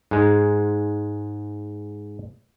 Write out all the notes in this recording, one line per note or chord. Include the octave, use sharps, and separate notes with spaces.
G#2 G#3